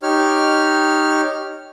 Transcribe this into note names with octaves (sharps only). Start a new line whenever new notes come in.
D#4 G4 C#5 F6